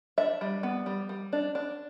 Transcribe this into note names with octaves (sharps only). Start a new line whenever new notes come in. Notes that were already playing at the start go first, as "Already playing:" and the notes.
D4 E5
G3
B3
G3
G3
D4
D4